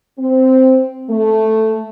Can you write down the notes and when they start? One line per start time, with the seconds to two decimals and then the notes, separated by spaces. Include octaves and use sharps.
0.19 C4
1.09 A3